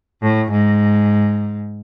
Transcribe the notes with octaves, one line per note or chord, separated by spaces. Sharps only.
A2
G#2